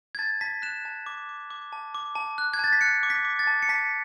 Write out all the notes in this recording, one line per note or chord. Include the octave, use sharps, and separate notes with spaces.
G#6
A5 A6
A5 B6
F#6 E7
A5
D6
D6
D6
A5
D6
A5
F#6
G#6
A5 A6
B6
F#6 C#7
D6
B6
D6
A6
A5
C#7
A5 B6